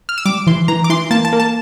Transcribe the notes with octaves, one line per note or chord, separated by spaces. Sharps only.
F6
E6
G3 D6
E3 C6
E3 A#5
D6
E3 C6
A#3 A5
A5
A#3
A5